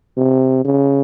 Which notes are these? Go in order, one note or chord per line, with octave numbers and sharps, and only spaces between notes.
C3
C#3